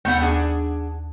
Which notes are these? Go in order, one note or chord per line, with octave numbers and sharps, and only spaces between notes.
D#2 A3 B3 F#5 G6
D4 G#4